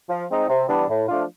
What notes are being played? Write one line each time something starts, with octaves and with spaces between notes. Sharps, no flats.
F3
G#3 C4 D#4
C3
E3 G3 B3 D4
A2
F3 A3 D4 F4